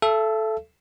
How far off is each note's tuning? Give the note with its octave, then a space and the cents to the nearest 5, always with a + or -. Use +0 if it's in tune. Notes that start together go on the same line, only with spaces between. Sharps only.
A4 -10 E5 +35